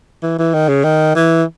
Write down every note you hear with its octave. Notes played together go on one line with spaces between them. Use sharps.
E3
E3
D#3
C#3
D#3
E3